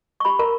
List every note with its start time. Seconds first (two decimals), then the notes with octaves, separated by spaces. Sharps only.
0.20 C#6
0.25 G4 B5
0.39 A#4 A#5